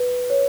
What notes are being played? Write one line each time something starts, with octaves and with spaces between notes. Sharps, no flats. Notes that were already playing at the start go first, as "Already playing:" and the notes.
Already playing: B4
C#5